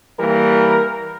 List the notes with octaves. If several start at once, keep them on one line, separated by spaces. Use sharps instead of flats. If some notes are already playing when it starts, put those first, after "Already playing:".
E3 G3 A#3 A#4